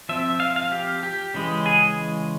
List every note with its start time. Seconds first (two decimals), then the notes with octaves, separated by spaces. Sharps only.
0.09 F3 C4 E5
0.40 F5
0.56 F5
0.72 G4
1.03 G4
1.34 C#3 E3 G#3
1.66 G#4